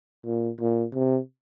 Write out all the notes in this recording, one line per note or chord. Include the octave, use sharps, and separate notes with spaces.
A#2
A#2
C3